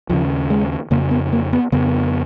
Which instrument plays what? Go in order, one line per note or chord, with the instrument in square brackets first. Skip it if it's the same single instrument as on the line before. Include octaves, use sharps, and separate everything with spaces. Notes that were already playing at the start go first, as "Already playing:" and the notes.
[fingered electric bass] D#2 C#3 F3
G#3
F2 C#3 A#3
B3
A#3
B3
F2 C#3 B3